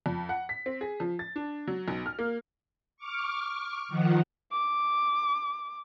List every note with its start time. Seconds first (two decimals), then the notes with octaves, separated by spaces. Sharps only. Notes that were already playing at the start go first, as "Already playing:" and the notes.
0.06 F2
0.29 F#5
0.49 B6
0.66 C4
0.81 G#4
1.00 F3
1.19 A6
1.36 D4
1.68 F#3
1.88 B1
2.06 F6
2.19 A#3
2.97 C#6 D6 F6
3.89 D#3 F3 F#5
4.52 D6